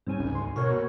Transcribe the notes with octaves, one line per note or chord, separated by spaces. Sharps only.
G#2 G3 C4 C#4 G#5
D2 C#3
C6
B2 F#4 A#4 C#5
A#2